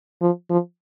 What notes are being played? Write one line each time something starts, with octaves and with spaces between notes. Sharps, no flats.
F3
F3